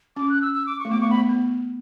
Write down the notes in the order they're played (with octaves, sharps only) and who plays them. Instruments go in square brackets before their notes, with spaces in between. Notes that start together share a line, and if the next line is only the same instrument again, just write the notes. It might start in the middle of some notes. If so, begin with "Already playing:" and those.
[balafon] C#4 [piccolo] D6
[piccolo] F#6
E6
E6
D6
C#6
[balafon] A3
[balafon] B3 [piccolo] D6
[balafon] A3 [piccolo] C#6
[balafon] B3 [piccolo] B5
[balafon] B3